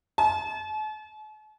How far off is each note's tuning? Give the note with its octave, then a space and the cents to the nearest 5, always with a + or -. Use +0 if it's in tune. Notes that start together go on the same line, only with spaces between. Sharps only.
A5 -40